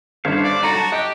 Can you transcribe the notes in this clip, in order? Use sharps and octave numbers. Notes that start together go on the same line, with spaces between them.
G1 D4 C5 C#5 F5
D5
D#4 F#4 A4 A#5
F#3 A5 C#6
G4 D#5 F#6